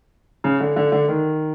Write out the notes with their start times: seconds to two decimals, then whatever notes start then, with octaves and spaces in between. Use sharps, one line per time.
0.44 C#3
0.60 D3
0.76 D3
0.92 D3
1.08 D#3